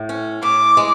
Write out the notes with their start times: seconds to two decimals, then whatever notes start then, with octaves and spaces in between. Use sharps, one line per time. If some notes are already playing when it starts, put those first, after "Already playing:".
Already playing: A2
0.09 C#4
0.43 A2 D6
0.77 G#3